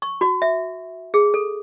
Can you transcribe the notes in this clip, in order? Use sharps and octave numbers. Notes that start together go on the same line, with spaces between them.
C#6
F#4
E5
G#4
A4